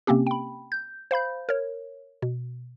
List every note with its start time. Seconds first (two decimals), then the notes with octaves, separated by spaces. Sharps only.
0.07 C3 A#3 C4 C#4 G4
0.27 G5 B5
0.72 G6
1.11 C5 F5 B5 G6
1.49 A#4 C#5
2.22 B2